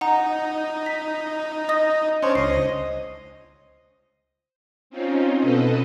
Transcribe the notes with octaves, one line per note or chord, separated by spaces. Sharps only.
D#4 F#5 A#5
B6
D#5 D#6 A#6
C#4 D4 C5 C#5 C6
C#2 D#5 C7
C4 C#4 D#4 F4
B2 A4 B4 D#5